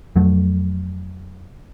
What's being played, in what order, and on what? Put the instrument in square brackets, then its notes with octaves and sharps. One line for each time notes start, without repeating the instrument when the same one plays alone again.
[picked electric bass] F2 F#3 A3